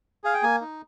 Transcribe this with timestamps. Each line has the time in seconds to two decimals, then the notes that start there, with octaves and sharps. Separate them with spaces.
0.24 G#4 F5
0.34 G5
0.43 A#3 G#5
0.61 D#4